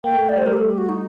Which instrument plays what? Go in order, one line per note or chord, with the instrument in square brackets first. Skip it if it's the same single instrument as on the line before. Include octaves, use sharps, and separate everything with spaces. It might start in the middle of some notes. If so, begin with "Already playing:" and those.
[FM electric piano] A#3 [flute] G5
[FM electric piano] A3
[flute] D5
[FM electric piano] G3 [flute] C5
[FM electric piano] G3 [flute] A#4
[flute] G4
A4
G4
F#4
D#4